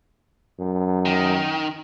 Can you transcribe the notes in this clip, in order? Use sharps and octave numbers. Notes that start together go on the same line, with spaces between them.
F#2
D#3